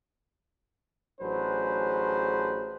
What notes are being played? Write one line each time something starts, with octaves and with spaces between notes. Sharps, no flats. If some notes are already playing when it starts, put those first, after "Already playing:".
A1 F#3 D4 G#4 B4 C5